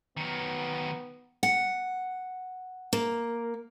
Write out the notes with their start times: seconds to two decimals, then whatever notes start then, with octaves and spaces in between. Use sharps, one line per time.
0.17 D#3 F#3 B3
1.43 F#5
2.93 A#3